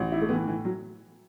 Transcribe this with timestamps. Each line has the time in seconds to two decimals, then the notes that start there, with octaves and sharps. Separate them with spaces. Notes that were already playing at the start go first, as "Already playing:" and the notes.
Already playing: A1
0.12 E4
0.22 A3
0.29 A2 E3 B3
0.48 E3
0.65 F#3